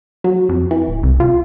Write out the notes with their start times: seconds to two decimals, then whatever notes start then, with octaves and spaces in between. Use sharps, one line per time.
0.24 F#3
0.49 F2
0.71 E3
0.87 D1
1.03 C2
1.20 F4